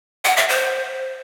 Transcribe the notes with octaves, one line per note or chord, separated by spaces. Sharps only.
F#5
E5
C5